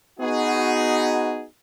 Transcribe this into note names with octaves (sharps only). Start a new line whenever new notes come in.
B3 D#4 F#4 G#4